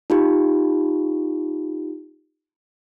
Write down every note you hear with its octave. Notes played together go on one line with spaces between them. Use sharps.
D#4 F4 G4